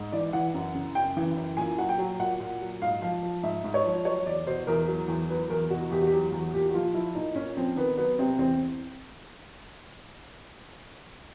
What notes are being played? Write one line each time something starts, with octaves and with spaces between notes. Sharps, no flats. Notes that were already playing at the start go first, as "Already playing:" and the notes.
Already playing: G#2
E3 D5
E3 F#5
F#2
C#3
F#2 G5
E3
F#2
A#2 G#5
F#3 F#5
G5
F#3
A#2 F#5
A#2
F#3
G#2 F5
F3 F5
F3
G#2 E5
G#2
C#5
F3
F#3 C#5
E2 D5
B2 C5
E2 A#4
F#3
E2
F#3 B4
E2 A#4
B2 F#4
E2 G4
F#4
G4
F#3
E2
F#4
A#2 G4
F#4
F3 F4
F3 E4
A#2 D#4
A#2 C#4
F3 C4
D#3 B3
F#3 B3
C3 C4
E2 C4